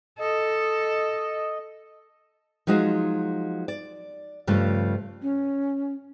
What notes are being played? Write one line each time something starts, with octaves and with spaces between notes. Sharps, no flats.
A4 D#5
F3 F#3 G#3 D#4 F#4
D5
G2 C#3 F3 A3
C#4